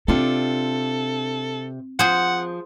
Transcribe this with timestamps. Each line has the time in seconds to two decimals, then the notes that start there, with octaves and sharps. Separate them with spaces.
0.08 C3 C4 D4 F4 A4
1.99 F3 G#4 C5 F#5